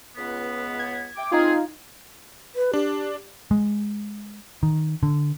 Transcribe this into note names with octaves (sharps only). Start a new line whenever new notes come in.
C#2 B3
G#6
E5 G5 D6
G#3 C4 D#4 F4 G#4
B4
D4 G4
G#3
D#3
D3